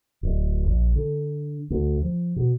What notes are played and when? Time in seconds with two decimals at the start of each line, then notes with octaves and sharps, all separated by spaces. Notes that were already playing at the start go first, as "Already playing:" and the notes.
0.23 D1
0.68 A#1
0.96 D3
1.70 D2
2.03 F3
2.36 B2